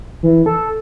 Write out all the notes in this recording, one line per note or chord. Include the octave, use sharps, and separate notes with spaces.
E3
A4